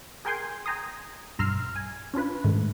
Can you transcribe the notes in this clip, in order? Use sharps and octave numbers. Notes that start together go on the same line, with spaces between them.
G#4 A#4 G5 G#5 C6
G5 G#5 A#5 C6 D#6
B1 G2 A#5 C6 E6 F6
G#5
C#4 D4 F4 B4
G#2 D#3 A3